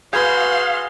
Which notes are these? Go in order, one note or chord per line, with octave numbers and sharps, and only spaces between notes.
F#4 G#4 B4 F5 C6 G6 G#6